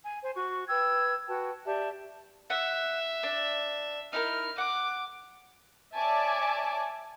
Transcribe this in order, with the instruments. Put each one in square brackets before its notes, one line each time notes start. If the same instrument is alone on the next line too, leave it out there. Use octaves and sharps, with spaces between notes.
[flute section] G#5
C5 G#5
F#4 C#6
B4 G5 E6 G#6
F#4 B4 G5 A5
G4 D5 E5 A5
[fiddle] E5 [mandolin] F#5
[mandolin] D4
[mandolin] D#4 E4 A#4 [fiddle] F6
[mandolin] F#5 [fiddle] D6
[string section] C#5 D5 E5 G#5 A5 D6